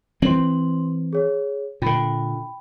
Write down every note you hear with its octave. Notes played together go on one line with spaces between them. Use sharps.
E3 C4 C6 F#7
G#4 C#5
A#2 D3 G5 B5